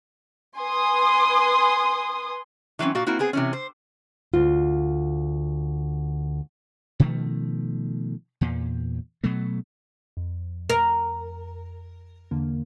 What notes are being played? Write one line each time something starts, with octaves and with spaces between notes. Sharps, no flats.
B4 G#5 C6 D#6
E3 F#3 G#3 C4 C#4
A#2 F#4 F5
A#3 C4 E4 F#4
B3 C4 G#4
C3 E3 C#4
C5
D2 F4
B2 D#3 F3 A3
E2 A#2
B2 F#3 A3
F2
A#4
E2 D3 A#3